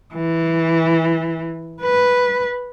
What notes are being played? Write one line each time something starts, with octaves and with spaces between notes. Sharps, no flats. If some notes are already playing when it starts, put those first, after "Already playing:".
E3
B4